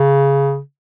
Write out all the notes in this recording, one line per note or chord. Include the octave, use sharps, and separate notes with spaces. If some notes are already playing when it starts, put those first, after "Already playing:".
Already playing: C#3